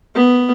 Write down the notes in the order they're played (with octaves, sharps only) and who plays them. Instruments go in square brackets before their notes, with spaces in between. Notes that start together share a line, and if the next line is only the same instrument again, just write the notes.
[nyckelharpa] B3